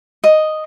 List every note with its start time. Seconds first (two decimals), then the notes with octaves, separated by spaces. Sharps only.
0.24 D#5